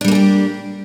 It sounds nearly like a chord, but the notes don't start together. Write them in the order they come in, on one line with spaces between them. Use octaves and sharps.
D4 G3 A#3 G#4 G4